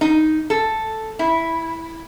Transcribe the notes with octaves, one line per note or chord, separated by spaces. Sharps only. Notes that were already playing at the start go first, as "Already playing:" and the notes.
D#4
A4
E4